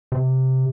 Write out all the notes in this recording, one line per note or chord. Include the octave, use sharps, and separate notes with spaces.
C3